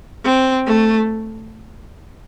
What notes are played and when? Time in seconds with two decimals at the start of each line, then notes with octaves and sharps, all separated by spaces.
0.24 C4
0.66 A3